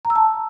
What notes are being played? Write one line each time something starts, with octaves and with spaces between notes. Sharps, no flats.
A#5
E6
A5